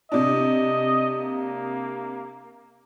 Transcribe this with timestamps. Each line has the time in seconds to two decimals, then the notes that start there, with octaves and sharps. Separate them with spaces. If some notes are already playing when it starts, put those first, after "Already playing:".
0.12 C3 D4 D#5
1.19 A#3